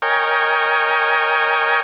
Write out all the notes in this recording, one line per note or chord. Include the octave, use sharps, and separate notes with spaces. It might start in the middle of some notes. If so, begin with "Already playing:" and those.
A#4 C#5 D#5 G5 G#5